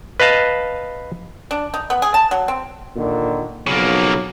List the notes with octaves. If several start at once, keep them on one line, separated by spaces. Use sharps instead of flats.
B4 D#5 F5 A5
D4
D#4
B3
G#4
A5
F#3
C4
A#2 D3 D#3
B1 F2 C#3 F#3 A#3